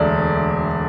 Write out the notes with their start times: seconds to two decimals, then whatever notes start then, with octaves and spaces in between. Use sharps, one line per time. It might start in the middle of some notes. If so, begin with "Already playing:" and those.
Already playing: E1 D2 A3 D5